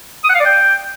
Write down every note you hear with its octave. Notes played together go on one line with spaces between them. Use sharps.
D#6
F#5
F5
D5
G5